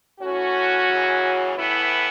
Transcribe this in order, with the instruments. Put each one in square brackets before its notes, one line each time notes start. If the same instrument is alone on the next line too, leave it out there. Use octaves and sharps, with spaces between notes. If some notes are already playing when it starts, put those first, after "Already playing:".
[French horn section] A2 E3 C#4 F#4
F#2 C#3 E3
A2 E3 B3 E4